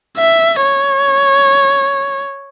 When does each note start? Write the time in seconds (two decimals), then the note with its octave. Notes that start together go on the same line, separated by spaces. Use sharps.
0.18 E5
0.62 C#5